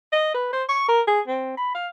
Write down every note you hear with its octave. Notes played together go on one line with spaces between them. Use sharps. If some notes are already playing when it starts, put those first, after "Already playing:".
D#5
B4
C5
C#6
A#4
G#4
C4
B5
F5